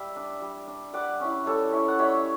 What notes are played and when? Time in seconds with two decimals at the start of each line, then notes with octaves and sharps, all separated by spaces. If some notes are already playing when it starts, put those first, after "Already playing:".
Already playing: G3 E5 G5
0.16 D4
0.42 G3
0.67 D4
0.93 G3 D5 F#5
1.20 C#4 E4
1.46 G3 A4 C#5
1.72 C#4 E4
1.88 F#5
1.99 G3 C#5 E5